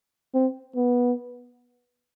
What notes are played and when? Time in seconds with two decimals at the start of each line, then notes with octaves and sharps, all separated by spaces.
0.34 C4
0.76 B3